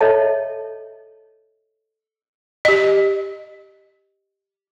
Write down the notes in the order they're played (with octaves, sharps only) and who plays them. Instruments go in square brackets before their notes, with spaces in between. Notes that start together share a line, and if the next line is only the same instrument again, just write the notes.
[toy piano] A4 C#5 D#5 E5 A5
[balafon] G4 D#5